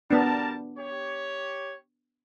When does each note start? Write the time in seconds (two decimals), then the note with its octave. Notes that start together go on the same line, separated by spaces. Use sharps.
0.11 G3 B3 D4 A#4 A5
0.78 G4 C#5